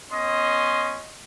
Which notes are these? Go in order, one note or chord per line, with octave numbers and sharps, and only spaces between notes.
B3 C#4 D#5 C6